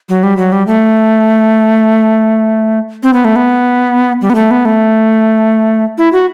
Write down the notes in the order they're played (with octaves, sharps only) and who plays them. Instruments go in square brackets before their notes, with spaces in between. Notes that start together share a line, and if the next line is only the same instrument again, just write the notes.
[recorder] F#3
G3
F#3
G3
A3
C4
B3
A3
B3
G3
B3
A3
B3
A3
E4
F#4